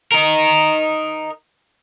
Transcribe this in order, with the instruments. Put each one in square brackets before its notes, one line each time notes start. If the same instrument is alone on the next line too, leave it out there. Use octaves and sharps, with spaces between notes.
[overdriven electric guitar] D#4 A#4